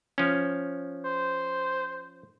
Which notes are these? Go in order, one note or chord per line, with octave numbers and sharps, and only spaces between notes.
F3 C#4
C5